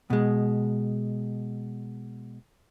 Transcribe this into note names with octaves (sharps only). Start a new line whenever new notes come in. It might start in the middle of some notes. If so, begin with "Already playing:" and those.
B2 G#3